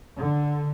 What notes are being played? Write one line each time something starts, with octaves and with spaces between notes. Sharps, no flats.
D3